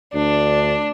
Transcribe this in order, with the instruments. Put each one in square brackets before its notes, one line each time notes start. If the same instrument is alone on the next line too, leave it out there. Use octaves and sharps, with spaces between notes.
[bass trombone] D2 [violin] D4